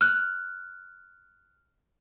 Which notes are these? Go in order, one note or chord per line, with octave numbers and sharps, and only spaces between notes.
F6 F#6